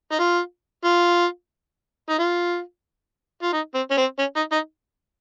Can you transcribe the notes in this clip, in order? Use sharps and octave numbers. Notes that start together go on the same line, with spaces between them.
D#4
F4
F4
D#4
F4
F4
D#4
C4
C#4
C4
C#4
D#4
D#4